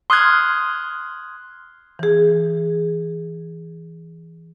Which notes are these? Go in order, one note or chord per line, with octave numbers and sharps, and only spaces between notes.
C6 D#6 F6 F#6 G#6
E3 G#4